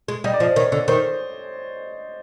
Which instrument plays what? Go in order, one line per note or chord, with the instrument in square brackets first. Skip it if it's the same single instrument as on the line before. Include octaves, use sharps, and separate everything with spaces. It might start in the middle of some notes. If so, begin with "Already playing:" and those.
[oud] G#3
[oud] G3 [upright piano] D#5
[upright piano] D5
[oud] F3 [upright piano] D#5
[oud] D#3 [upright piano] C#5
[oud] D3
[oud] D#3 [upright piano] C5